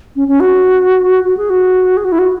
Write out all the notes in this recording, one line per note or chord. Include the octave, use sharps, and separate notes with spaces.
C#4
C#4
F#4
F#4
G#4
F#4
G#4
F#4
E4
F#4